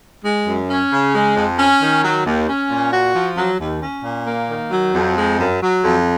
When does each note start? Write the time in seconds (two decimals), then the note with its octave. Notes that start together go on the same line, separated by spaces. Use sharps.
0.24 G#3
0.47 F#2
0.70 C#4
0.91 C#3
1.14 G#3
1.36 F2
1.59 C#4
1.81 D#3
2.04 F#3
2.26 D#2
2.48 C#4
2.70 A#2
2.93 F#4
3.15 F3
3.37 F#3
3.60 D#2
3.81 C#4
4.04 A#2
4.27 A#3
4.49 D#3
4.70 F#3
4.94 F2
5.16 G#3
5.39 F#2
5.61 F#3
5.83 F2